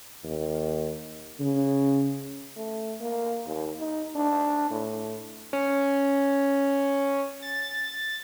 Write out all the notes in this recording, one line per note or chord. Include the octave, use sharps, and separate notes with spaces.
D#2
C#3
A3
A#3
D#2
D#4
D4
A2
C#4
A6